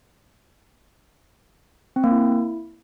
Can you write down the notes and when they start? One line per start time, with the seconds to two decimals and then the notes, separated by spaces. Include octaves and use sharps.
1.96 C4
2.04 A#3
2.11 E4